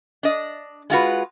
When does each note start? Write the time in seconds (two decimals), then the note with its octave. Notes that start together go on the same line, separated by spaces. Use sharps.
0.23 D4 D#5
0.90 G#3 F4 F#4 B4